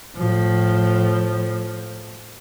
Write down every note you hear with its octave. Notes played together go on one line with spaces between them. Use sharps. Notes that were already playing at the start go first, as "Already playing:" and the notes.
A2 F3